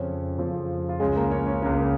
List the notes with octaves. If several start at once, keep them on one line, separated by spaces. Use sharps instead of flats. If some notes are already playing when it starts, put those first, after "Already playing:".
Already playing: F2 C#3 C#4
F2 C#3 F3 F4
F4
C#2 C#3 G#3 G#4
A#3 A#4
C#4 C#5
C#4 C#5
C#2 C#3 A#3 A#4